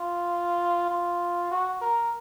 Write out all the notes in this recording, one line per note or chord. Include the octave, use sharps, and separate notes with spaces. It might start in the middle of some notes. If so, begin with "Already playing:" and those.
Already playing: F4
F4
F#4
A#4